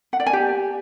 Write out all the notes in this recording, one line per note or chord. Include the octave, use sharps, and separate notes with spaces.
F#5
D5
G#5
G4